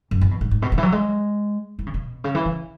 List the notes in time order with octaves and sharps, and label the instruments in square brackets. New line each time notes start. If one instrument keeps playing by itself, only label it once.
[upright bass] F#2
E3
B2
G#2
G#2
B2
C#3
E3
F#3
G#3
E3
C#3
B2
C#3
E3
C#3